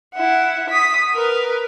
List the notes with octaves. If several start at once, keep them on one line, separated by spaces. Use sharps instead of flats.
E4 F#5
D#6 B6
A#4 B4